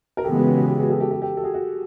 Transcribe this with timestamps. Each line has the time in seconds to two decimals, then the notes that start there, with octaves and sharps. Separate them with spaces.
0.17 A#4
0.24 C#3 E3 G#3 B3 G4 A4
0.35 F#4 G#4
0.46 G4
0.57 F#4
0.68 G4
0.79 F#4 G#4
0.90 G4 A4
1.00 G4 A4
1.11 G4 A4
1.22 G4 A4
1.37 A4
1.43 F#4 G#4
1.54 F#4